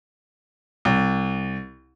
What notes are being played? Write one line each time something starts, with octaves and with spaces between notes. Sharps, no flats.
C2